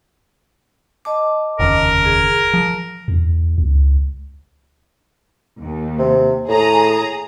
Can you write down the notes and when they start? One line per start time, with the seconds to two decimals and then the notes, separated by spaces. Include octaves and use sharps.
1.05 D#5 A5 D6
1.59 F1 D#2 C#3 A#4
2.05 G#4
2.53 F3
3.08 E2
3.58 C#2
5.59 D#2
5.99 C3
6.49 A2 G#4 A#5 D#6